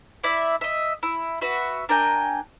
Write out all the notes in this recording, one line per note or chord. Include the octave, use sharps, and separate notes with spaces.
E4 D5 E5
D#5 E5
E4
F#4 B4 E5
D4 A#4 G5 G#5